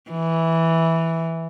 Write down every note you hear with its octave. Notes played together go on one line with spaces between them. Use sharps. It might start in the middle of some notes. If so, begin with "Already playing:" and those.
E3